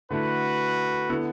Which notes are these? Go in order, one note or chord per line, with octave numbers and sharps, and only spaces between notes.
D3 A3 E4 F#4 A4 B4
D3 B3 E4 A4